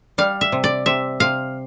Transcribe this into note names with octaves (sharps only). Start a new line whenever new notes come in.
G3 F5
E5
C3
D5
C3 E5
C3 F5